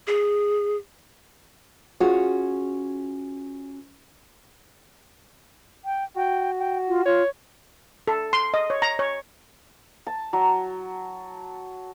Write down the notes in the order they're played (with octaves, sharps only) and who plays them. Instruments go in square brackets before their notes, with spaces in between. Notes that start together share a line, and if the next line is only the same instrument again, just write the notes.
[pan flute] G#4
[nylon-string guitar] C#4 F4 F#4 G#4 C#5
[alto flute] G5
[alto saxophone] F#4 [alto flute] G5
[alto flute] G5
F4
[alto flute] F4 [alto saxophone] C#5
[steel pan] A4
C6
D#5
C#5
A#5
C#5
[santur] A5
F#3